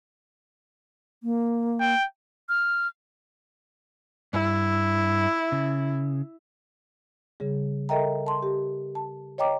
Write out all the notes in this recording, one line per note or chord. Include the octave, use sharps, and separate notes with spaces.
A#3
G5
F6
G2 E4
C#3
C#3 G3 G#4
A4 A#4 D#5 E5 G5 A#5
A5 C6
G4
A5
C#5 D#5 G5 A#5 D6